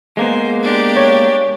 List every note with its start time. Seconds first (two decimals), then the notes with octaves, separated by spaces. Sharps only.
0.17 G#3 A#3 B3 C5
0.61 D4 G4
0.97 C#5